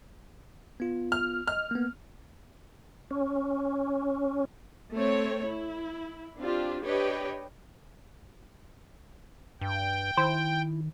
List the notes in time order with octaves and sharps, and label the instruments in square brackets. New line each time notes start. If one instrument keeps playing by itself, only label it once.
[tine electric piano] B3 F4
[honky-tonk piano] F6
[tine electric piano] D#5 [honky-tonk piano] F6
[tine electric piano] A#3 B3
[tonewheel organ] C#4
[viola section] A3 C4 C#5
E4
C4 D4 F4 G4
D4 G4 B4 C#5 D#5 G5
[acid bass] G2 [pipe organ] G5
[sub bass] D#3 [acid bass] E4 [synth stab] C5